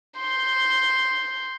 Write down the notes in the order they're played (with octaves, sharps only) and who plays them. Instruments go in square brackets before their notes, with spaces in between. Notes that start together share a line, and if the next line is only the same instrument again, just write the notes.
[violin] C6 G6